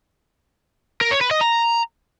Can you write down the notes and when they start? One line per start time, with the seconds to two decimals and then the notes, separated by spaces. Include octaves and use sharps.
1.01 A#4
1.11 C#5
1.21 B4
1.31 D#5
1.41 A#5